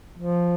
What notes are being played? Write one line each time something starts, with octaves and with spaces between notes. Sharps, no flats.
F3